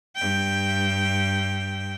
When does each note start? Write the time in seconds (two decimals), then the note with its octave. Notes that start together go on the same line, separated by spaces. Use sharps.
0.16 G2 G5